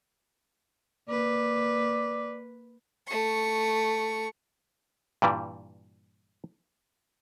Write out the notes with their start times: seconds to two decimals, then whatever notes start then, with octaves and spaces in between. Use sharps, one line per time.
1.09 A#3 B4 D5
3.07 A3 C#6
5.22 G2 A#2 E3 G3